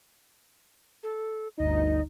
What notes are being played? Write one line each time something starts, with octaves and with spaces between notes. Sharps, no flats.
A4
G1 D2 D#4 D#5